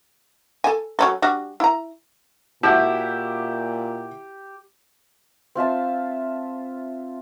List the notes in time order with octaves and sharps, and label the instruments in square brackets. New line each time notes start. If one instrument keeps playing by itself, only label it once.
[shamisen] A4 G#5
F#3 C#4 A4
G3 D4 F#4
E4 A#5
[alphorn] A#2 [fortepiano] E4 F#4 [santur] G4 [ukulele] A5
[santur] C4 F4 E5 A5